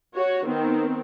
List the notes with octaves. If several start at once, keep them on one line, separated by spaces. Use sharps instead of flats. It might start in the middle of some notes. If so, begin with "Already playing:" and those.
F#4 C#5
D#3 B3 C4